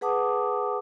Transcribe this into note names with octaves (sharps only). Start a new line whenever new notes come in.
G#4 B4 F#5 A5 D6 D#6